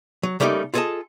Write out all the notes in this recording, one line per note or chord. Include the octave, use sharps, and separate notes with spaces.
F#3
C#3 G3 A3 A#3 D#4 G4
F4 G#4 A4 B4 D#5 A5